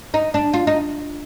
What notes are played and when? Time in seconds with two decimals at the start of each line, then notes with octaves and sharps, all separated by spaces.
0.14 D#4
0.34 D4
0.53 F4
0.67 D#4